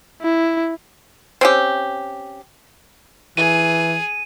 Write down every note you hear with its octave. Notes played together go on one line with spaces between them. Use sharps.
E4
C4 C#4 G4
E3 G#4 D#7